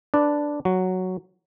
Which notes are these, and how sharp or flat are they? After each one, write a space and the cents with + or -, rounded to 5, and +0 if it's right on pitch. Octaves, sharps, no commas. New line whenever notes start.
D4 +0 B4 +0 D5 +0
F#3 +0 F#4 +0